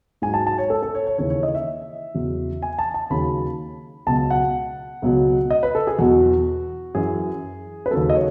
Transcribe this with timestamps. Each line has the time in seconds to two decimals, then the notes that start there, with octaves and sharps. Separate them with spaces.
0.22 G#2 F#3 G#5
0.34 A5
0.47 A5
0.58 C#5
0.70 A4
0.83 A4
0.95 C#5
1.07 C#5
1.18 D#2 C#3 E3 C#5
1.30 C#5
1.43 D#5
1.55 E5
2.14 E2 C#3 F#3
2.62 G#5
2.79 A5
2.94 A5
3.10 D#2 C#3 F#3 B5
4.07 C#2 B2 F#3 A5
4.30 F#5
5.02 C#2 B2 F#3
5.51 D#5
5.63 B4
5.75 A4
5.87 G#4
5.99 E2 B2 F#3 F#4
6.95 F#2 E3 G#4
7.86 B4
7.91 D#2 C#3 F#3 A4
8.10 D#5
8.15 C#5